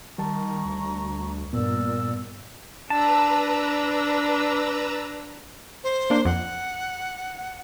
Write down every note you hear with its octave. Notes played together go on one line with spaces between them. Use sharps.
D#3 G3 A5 A#5 C#6
D2
G2 A#2 B3 A#4 D5 E6
D4 B4 A5 A#5 E6
C5
A#3 D4
F2 F#5